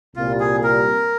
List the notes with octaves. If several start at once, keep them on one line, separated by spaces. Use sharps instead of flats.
C2 A#2 G3 F4
G#4
A#4